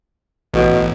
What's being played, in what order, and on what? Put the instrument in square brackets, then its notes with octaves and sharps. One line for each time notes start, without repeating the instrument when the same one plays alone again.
[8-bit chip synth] A1 [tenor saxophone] B2